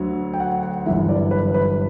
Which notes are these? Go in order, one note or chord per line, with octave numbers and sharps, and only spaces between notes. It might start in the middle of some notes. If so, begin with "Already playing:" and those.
Already playing: D2 D3 F#3
G5
F#5
F#5
G1 F#2 E3 E5
D5
B4
B4